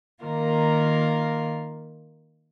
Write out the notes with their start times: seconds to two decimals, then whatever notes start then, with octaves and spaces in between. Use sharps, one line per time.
0.24 D#3 A#3 F4 A#4